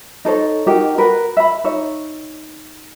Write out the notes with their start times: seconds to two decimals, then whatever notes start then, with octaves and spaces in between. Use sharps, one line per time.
0.25 D#4 A4 C5 C#5
0.67 D#4 F#4 G4 A#4
0.98 F#4 A#4 B4
1.37 E5 B5
1.64 D#4 C#5 E5